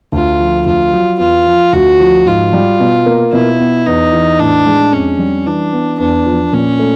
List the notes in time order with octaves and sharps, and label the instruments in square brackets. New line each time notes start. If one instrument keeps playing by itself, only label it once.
[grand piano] D2 [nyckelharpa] F4
[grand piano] F3
[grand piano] D2 [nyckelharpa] F4
[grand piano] F#3
[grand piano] E2 [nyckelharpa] F4
[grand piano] F3
[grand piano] D2 [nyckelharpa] F#4
[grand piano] F3
[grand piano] G#2 [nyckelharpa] F4
[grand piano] G3
B2
A#3
[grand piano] B2 [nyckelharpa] E4
[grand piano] B3
[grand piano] E2 [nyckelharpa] D#4
[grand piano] E3
[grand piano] A2 [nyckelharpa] D4
[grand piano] G#3
[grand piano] F2 [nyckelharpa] C#4
[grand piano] G3
[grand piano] E3 [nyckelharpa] D4
[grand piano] B3
[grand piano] E2 [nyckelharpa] D4
[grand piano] F3
[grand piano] A#2 [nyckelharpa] C#4
[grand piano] A3